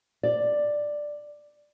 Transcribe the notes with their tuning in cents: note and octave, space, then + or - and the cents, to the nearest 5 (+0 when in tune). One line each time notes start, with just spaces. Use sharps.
D5 +5